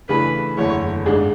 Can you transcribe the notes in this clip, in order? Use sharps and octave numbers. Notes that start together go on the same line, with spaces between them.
C#3 E3 A3 D4 G#4 B4
F#1 E2 D3 A3 E4 C#5
G#1 G#2 G#3 D4 G#4